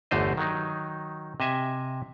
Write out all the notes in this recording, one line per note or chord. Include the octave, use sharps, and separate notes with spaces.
G1 E2 D3 A3 C5 D#5
D#3 F#3 D#4
C3 D#5 E5 G#5